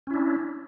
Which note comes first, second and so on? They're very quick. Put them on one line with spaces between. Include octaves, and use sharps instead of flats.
C#4 E4 D4